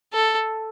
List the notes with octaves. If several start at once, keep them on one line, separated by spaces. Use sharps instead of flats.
A4